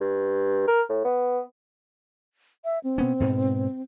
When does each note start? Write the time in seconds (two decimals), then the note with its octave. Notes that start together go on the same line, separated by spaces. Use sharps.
0.01 G2
0.67 A#4
0.89 A2
1.04 B3
2.65 E5
2.84 C4
2.98 B2 B3 C#4
3.20 G#2 B2